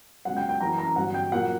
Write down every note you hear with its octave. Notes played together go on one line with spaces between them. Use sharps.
C#2 B2 F#3 F#5
G5
G5
F#2 E3 A#3 A#5
A#5
G2 D3 F#3 B3 F#5
G5
A#2 F#3 A#3 F#5